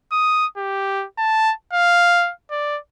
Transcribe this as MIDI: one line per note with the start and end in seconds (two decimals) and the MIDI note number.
0.12 0.46 87
0.57 1.05 67
1.18 1.53 81
1.73 2.32 77
2.51 2.79 74